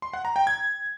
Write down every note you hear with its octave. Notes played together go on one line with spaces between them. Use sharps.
C6
F#5
A#5
G5
G#6